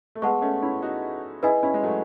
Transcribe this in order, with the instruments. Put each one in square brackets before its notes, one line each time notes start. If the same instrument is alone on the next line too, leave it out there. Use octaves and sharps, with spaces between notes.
[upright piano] A3
[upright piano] G#3 B3 [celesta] G#4 B4 F#5 A5 C#6
[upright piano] A3 C#4
C#4 E4
D#4 F#4
[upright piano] E4 G#4 [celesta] B4 D#5 G#5
[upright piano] C#4 E4
G#3
F#3 A3